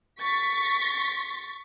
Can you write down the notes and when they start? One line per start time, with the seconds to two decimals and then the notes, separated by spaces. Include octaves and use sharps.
0.20 C#6 A6 B6